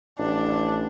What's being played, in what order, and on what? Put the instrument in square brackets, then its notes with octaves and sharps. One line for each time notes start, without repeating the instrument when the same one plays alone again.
[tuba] A1 [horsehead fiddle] D4